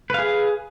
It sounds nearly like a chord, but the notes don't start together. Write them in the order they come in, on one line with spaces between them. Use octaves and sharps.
B4 F5 G#4